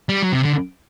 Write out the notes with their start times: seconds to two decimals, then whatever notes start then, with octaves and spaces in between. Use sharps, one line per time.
0.09 G3
0.23 F#3
0.32 C3
0.42 D3